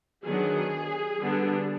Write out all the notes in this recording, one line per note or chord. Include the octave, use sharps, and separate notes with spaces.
D#3 F#3 B3 D4 G#4
D3 G3 B3 D4